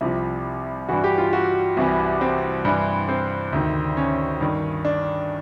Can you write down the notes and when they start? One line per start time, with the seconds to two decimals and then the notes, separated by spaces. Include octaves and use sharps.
0.01 C2 C3 F3 E4
0.89 G2 E3 F#4
1.04 G4
1.18 F4
1.33 F#4
1.77 C2 C3 E3
2.21 C4
2.65 G2 E3
3.09 C4
3.53 D2 C3 D#3
3.97 C#4
4.41 G2 D#3
4.85 D4